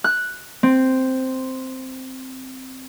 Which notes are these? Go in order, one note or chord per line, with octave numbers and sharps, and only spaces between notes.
F#6
C4